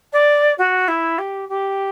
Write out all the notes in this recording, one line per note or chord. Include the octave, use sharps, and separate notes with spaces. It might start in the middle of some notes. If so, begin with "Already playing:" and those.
D5
F#4
E4
G4
G4